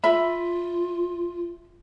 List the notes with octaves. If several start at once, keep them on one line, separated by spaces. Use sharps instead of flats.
F4 E5 B5